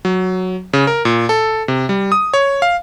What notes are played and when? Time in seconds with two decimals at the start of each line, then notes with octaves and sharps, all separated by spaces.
0.05 F#3
0.73 C#3
0.87 A#4
1.05 A#2
1.29 A4
1.68 C3
1.89 G3
2.12 D#6
2.34 C#5
2.62 F5